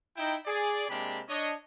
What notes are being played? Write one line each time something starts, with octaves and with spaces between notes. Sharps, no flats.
D#4 E4 G5
G#4 D5
C3 G#3 A#3 D4 G4 B5
D4 C#5 D#5